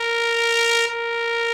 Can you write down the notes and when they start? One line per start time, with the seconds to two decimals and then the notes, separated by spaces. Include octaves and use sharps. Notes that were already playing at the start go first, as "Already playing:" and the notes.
Already playing: A#4
0.88 A#4